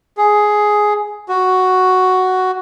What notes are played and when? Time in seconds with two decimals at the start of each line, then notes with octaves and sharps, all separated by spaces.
0.17 G#4
1.29 F#4